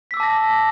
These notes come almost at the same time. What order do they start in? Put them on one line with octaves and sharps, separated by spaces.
B6 E6 D6 A5 A#6